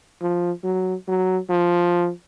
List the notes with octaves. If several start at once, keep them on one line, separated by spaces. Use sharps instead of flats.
F3
F#3
F#3
F3